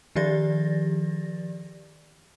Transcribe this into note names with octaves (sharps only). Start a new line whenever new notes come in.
D#3 F3 G4 D5 A6 A#6